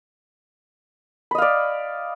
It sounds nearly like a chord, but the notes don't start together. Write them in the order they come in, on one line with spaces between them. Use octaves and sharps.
B5 D#5 F5 D5